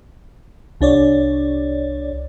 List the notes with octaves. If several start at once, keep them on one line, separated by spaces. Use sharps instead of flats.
C2 D4 C#5 D5